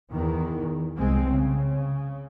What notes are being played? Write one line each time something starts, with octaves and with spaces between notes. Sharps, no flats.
E2 D#3
C2 G#3 C4
C#3